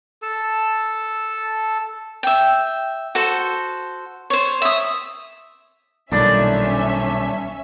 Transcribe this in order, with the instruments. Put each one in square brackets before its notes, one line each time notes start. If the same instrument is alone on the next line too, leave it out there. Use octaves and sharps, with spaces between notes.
[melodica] A4 A5
[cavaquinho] E5 G5
F#4 A4 C5
C5 C#5
E5 D#6
[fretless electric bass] B1 A#2 [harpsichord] G2 D3 D#3 [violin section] C#4 E5 [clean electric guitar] D4